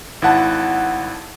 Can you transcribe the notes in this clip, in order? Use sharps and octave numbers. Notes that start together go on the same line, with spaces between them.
G#1 E4 F#5 A5